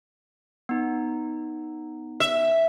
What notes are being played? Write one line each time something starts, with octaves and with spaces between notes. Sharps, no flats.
B3 D#4
E5